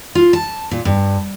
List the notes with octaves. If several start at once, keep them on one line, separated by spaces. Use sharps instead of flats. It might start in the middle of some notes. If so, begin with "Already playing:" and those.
F4
A5
A#2
G2